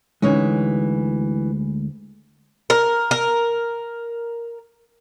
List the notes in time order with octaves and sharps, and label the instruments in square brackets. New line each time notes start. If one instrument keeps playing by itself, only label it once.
[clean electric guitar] D2 G#3 [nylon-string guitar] E3 C#4 D#4
[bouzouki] A#4
A#4